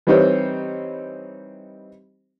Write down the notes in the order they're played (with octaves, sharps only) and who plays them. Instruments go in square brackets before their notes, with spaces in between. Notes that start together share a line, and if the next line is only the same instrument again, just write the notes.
[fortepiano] E3 G3 C4 D#4 C5 C#5